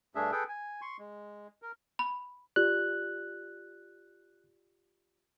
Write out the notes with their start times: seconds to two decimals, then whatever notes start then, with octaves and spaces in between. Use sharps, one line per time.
0.15 G2 A3 D4 G#4 E5
0.32 G#4 A4 B4 G5
0.48 G#5
0.81 C6 C#6
0.99 G#3
1.62 A#4
1.99 B5
2.56 F4 G4 D5 F#6